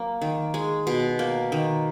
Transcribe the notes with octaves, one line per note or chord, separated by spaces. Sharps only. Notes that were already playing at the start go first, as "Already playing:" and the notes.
Already playing: F#3 A#3
D#3
G#3
B2
A#3
D#3